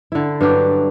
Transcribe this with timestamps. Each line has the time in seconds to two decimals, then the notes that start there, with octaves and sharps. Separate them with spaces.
0.12 D3 E4
0.41 G2 F#3 D4 G4